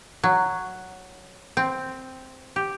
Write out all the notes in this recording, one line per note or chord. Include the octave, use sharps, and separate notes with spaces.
F#3
C4
G4